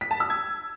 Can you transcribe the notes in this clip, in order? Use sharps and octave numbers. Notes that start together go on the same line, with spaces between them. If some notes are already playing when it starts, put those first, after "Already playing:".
B6
A5
E6
G#6